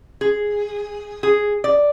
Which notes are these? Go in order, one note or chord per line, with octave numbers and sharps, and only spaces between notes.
G#4
G#4
D5